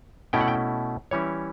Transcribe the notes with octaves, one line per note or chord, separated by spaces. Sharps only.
B2 A3 C#4 E4 G5
F#5
G5
E3 G3 C#4 E4 C#5